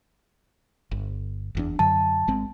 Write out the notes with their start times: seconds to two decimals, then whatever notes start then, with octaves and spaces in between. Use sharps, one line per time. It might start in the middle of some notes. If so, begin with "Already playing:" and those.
0.91 G1
1.55 F#1 E2 D4
1.79 F#2 D3 F#3 A5
2.27 G#1 G#3 C4